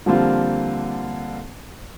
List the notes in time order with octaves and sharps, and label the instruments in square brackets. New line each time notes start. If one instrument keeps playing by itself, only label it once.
[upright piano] D3 F3 G3 A#3 C4 F4